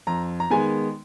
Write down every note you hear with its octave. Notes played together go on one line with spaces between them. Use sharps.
F2 A#5
A#5
D#3 G#3 B3 G#5